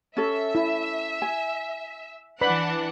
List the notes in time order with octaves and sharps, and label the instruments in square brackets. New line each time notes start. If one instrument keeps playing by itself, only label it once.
[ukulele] C#4 A4 [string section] E5
[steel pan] E4
[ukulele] G#5
[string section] E3 D4 F#5 [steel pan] B4 D5 B5